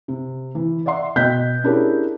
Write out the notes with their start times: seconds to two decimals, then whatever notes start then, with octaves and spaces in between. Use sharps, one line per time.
0.08 C3
0.55 E3
0.86 D5 E5 F#5 C6
1.16 B2 D#5 G5 F#6 G6 B6
1.64 C#4 D4 E4 G4 G#4 A#4